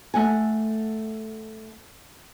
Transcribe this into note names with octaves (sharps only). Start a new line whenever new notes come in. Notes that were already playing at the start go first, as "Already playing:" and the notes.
A3 F#5 G#5